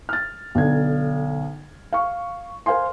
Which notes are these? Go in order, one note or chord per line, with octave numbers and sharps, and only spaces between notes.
F6 A6
B1 D3 G#6
F5 C#6
A#4 C5 F5 G#5 C6